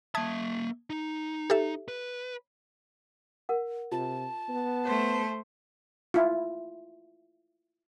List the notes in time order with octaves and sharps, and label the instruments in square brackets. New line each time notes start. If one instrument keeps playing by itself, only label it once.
[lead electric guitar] A#3 E5 [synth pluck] A5 D#6 G#6
[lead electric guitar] D#4
[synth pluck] G4 A4 E5
[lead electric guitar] B4
[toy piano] A#4 F#5
[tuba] C3 [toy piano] F4 [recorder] A5
[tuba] B3
[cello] A3 C5 [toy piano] C#5
[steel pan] E4 F4